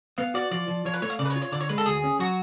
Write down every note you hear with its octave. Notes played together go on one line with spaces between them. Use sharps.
B3 F5
F#4 D5
F3 D5
F3
F3 C#5
B4
A3 C#5
F5
C#3 D5
B4
C#5
F4
C#5
D3 D5
C#5
G#3 B4
A4
D2 G#4
C#4
F#3 F#4